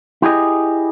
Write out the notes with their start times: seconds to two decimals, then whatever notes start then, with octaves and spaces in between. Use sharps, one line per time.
0.22 E4 G4 G#4 D#5